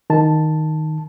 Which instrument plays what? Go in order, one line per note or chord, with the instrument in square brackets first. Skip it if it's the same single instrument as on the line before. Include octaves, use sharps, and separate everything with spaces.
[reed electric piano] D#3 A5